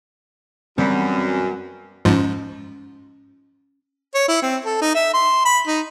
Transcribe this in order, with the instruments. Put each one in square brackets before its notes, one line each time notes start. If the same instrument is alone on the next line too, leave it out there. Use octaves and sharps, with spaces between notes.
[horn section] F#2 [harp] G3 B3 [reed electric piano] C4
[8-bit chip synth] G#2 F3 [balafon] C#4
[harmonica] C#5
E4
C4
A4
D#4
E5
C6
B5
D#4